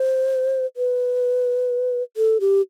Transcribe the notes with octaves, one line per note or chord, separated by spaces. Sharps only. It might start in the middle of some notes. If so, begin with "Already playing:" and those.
Already playing: C5
B4
A4
G4